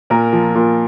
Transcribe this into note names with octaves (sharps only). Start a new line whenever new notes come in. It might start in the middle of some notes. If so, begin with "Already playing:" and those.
A#2 A#4
F3
A#2